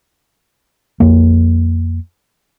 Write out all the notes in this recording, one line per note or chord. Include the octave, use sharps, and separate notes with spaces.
F2 A#3